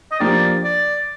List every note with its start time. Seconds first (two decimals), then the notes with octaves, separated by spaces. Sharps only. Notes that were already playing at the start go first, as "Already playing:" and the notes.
0.11 D#5
0.19 F3 A#3 D4 G4 D5
0.64 D5